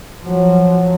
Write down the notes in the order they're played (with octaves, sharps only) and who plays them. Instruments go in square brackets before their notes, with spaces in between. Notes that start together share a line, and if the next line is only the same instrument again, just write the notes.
[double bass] F3 F#3